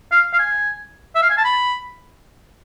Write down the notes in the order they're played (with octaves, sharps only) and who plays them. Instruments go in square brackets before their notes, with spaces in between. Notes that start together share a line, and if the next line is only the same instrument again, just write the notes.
[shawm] F5
F5
G#5
E5
F5
G#5
A5
B5